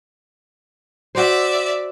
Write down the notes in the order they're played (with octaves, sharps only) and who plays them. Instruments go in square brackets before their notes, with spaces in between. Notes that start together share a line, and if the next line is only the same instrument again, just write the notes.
[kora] F#4 C5 [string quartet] D5 E5